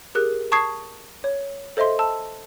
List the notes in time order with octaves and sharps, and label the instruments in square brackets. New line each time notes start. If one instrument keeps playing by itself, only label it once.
[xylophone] G4 G#4 A#4 F#6
A5 C#6 D#6 G#6 C7
C#5
A4 C5 D#5 E5 C6
A5 E6